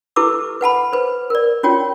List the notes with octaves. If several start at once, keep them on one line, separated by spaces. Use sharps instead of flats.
E4 G4 A4 B4 D6 E6
B4 F#5 A5 B5
B4 C5
A#4 D5
C#4 F4 F#4 C#5 G5